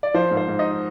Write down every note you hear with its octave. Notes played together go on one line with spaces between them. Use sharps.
D5
F3 C5
G#2
C5
G#2
D#4 D#5